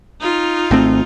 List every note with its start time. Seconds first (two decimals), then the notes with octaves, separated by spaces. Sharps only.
0.20 D#4 F4
0.71 G#1 A3 C4